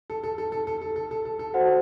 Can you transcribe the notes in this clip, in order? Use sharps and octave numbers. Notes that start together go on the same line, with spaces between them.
A4
A4
A4
A4
A4
A4
A4
A4
A4
A4
F#4 A4 C5 F#5